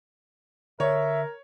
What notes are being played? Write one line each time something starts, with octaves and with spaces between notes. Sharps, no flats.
D3 A#4 C#5 E5